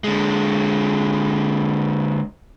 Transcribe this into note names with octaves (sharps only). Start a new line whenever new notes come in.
D3 G#3